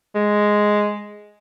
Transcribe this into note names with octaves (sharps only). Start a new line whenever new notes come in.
G#3